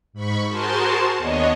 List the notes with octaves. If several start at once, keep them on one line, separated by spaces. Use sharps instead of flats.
G#2 B5 C#6
F#4 G#4 A#4 C5 A5 C6
D#2 B3 D4 C#5 D#5